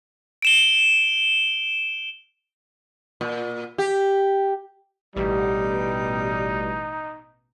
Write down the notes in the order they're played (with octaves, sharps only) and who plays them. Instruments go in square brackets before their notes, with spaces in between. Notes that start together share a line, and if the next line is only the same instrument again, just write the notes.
[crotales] D7 E7 G7
[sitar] A#2
G4
[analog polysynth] A1 B2 [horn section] G3 [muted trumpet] D#4